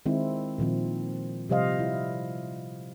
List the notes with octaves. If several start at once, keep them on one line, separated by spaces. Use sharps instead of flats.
D#3 G#3 C4 D#4 E4
A#2 D#3 F3 C4
C3 F3 G3 C5 D#5 F5
E4